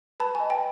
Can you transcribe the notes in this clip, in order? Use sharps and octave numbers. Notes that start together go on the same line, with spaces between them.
B4 A5 B5
G#5
D#5
G5 A5